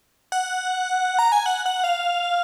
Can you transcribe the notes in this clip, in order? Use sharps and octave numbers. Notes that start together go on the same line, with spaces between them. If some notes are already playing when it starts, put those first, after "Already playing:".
F#5
A#5
G#5
F#5
F#5
F5